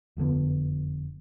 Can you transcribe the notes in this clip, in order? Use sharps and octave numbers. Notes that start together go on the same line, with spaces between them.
F#1 F2 D3 B3